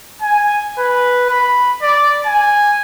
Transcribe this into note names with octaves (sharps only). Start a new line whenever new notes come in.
G#5
B4
B5
D5
G#5